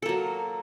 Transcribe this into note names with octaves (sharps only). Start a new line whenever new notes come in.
F#3 A#3 A4